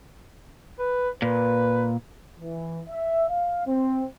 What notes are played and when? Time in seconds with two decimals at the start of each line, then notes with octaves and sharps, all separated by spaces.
0.79 B4
1.22 A#2 B4
2.40 E3
2.89 E5
3.29 F5
3.67 C4